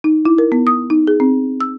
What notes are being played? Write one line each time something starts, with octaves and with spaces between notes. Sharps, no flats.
D#4
E4
A#4
B3
D#6
D#4
G#4
C4
E6